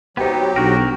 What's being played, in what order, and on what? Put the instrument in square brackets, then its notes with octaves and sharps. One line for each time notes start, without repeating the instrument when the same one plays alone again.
[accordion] F#3 G4 [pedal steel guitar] B3 D#4 [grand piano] C5 G5
[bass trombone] B1 [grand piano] D4 [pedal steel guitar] F#4 A#4